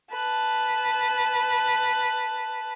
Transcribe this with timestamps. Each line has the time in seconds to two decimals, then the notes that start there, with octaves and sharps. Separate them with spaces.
0.12 B4 A5